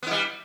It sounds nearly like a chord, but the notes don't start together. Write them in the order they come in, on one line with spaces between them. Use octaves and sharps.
B3 E4 G3